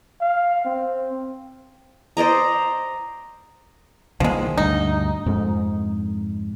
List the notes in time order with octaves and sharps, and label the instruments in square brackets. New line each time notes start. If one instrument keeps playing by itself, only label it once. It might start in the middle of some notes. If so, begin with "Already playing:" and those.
[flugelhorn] F5
C4
[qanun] C5 D5 D#5 A#5
[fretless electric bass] C2 D#3 A#3 [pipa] F3 G#3
[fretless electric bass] D2 G2 [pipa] D#4
[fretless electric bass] F2 G#2